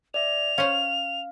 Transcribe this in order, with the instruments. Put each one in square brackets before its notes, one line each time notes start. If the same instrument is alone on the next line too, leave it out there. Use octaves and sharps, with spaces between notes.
[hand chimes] D5 E5 [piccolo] F7
[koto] C#4 C5 [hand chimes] F5